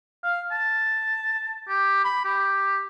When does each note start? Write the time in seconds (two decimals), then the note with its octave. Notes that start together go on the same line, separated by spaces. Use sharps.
0.23 F5
0.51 A5
1.69 G4
2.04 B5
2.25 G4